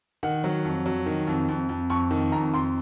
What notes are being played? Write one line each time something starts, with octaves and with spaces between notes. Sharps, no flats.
D#3 F#5
F#3
F2
F#3
D#3
F2
F2
F2
F2 C#6
D#3
F2 A#5
F2 C6